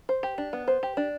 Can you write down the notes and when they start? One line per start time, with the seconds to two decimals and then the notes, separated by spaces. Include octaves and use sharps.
0.09 C5
0.23 G4
0.38 D4
0.53 B3
0.68 C5
0.83 G4
0.97 D4